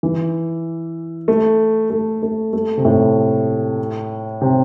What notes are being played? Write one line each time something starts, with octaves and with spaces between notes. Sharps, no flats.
E3
A3
A3
A3
A3
C3
A2
C3